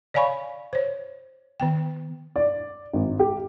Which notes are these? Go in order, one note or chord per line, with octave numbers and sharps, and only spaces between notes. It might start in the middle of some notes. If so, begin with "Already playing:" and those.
C#5 D5 F5 G#5 B5 C#6
C5 C#5
D#3 B3 G5
D5
G#1
G4